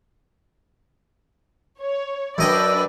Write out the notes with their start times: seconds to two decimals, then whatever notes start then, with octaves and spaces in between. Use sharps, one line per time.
1.80 C#5
2.38 F#2 D4 B4 D5 D#5 G5 E6